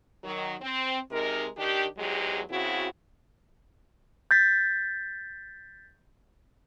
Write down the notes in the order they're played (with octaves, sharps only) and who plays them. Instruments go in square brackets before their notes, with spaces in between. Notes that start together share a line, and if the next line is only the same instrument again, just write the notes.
[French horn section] D#3 F#3
C4
C3 G#3 D#4 A#4
D#3 D4 G4
E2 G#2 F#3 G#3 G4
C#3 C4 E4 F#4
[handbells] G6 A6 B6